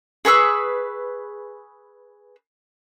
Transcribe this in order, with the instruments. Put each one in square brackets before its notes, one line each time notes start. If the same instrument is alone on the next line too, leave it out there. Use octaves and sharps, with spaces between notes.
[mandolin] G#4 B4 C#6 E6